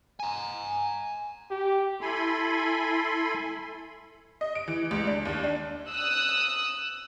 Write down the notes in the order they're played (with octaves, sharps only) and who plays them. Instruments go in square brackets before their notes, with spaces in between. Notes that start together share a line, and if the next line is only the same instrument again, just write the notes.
[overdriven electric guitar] G#5 A#5
[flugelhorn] G4
[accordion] E4 A4 G#5 B5 C6
[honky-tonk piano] D#5
D7
E3
C#2
D4
D#2
D4
[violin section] D#6 E6 F#6